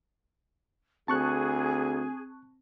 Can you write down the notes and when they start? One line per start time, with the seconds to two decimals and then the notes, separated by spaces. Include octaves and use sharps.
1.08 D2 C4 G#4 A5 C#6 F#6